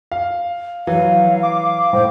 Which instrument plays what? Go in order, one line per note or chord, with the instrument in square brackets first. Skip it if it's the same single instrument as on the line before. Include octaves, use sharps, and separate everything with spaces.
[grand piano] F5
[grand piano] E3 [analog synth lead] F#3 [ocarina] F5
[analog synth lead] D6
[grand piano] A2 [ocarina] C5